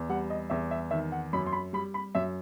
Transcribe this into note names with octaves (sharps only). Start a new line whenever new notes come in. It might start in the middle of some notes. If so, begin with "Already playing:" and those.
Already playing: E2
G3 F#5
D#5
E2 E5
E5
D#3 E5
F#5
F#2 B5
C6
B5
G3 B5
B5
F#2 E5